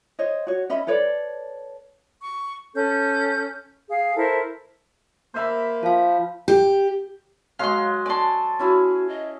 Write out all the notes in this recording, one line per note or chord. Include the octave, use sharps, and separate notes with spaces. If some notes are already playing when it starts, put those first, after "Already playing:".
C5 C#5 D#5
F#4 C#5
C#4 D#5 E5 B5
A4 B4 C#5 D5
C#6
C#4 A4 G6
G#4 F5
E4 A4 A#4 C5
A#3 C5 E5 B5
F3 F4 F5
G4
F#3 G#3 F5 C6
D5 G#5 A5 C6
C#4 E4 F#4 G#4
D#5